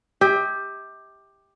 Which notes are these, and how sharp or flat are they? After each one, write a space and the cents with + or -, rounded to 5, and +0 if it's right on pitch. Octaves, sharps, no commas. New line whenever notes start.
G4 +10 E5 -45